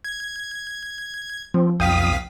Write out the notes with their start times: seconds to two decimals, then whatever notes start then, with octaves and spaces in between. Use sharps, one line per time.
0.05 G#6
1.54 F3 C4
1.80 B1 F2 F5 G5 D#6 B6